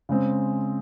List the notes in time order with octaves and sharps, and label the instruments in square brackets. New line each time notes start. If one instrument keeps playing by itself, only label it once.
[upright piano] C#3 G#3 C4